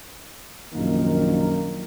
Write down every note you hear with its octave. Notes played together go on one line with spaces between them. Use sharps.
A#1 F#2 D#3 A#3 A#4